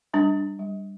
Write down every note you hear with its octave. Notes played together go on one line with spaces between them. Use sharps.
G3 D4
D4
G3